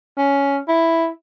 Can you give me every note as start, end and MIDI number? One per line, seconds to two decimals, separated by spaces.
0.18 0.59 61
0.68 1.09 64